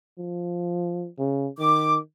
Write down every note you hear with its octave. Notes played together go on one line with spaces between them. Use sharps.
F3
C#3
D#3 D6